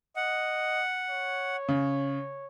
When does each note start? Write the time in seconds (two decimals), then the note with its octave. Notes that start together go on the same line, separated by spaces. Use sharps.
0.16 D#5 F#5
1.10 C#5
1.68 C#3